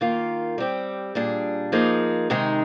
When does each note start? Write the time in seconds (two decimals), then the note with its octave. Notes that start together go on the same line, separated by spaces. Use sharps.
0.01 D#3 A#3 F4
0.58 G3 C4 G4
1.15 A#2 G3 D4 G#4
1.72 F3 A#3 D#4 G#4
2.30 C3 D#3 G#3 D#4 G#4